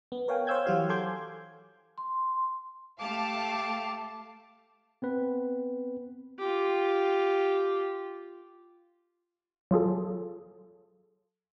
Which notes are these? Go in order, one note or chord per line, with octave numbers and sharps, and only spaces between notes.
B3
A#4 C#5 F5 G5 G#5
C5 C#5 F5 E6 G6 G#6
E3 F#3 F#4 G4 F5
A4 G#5 C6 D6 G6 G#6
C6
A3 G4 F5 A5 D6
B3 C4 B4
F4 G4
F#3 F4 G#4 A4